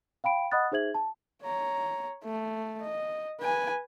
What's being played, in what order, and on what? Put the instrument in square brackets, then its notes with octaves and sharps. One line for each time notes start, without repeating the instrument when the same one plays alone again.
[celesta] F5 G5 B5 D7
D#5 F#5 B5 D#6 F#6 A6
D#4 G#4 C5 E5 G#6 F#7
A5
[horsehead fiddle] C#5 A#5
A3
D#5
B4 G#5